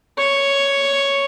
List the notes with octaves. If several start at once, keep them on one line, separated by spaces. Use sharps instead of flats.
C#5